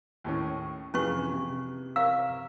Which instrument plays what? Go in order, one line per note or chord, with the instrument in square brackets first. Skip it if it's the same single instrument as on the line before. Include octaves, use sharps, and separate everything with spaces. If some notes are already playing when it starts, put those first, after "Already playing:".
[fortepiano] D#2 A2 C#4
[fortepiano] F2 G#4 [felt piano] C3 E3 [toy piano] C#4 B4 C#6
[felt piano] C3
[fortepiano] A#4 C#5 E5 [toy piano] F5 [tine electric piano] E6